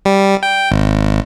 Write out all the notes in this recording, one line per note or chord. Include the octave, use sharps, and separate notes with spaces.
G3
G5
G#1